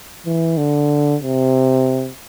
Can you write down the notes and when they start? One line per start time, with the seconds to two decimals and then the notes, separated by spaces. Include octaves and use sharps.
0.26 E3
0.58 D3
1.22 C3